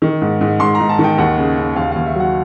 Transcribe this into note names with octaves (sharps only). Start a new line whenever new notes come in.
D#3
G#2
G#2
G#2 C6
A#5
G#2
A5
D#3
G5
D#2 F#5
C#3
C#3
D#2 F5
F5
D#2
E5
F#3 F#5